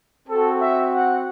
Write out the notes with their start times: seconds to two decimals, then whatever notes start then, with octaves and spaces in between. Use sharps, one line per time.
0.28 C4 F#4 A4
0.60 E5
0.93 F#5